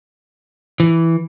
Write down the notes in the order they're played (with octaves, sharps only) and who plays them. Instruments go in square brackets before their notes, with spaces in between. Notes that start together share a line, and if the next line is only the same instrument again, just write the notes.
[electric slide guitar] E3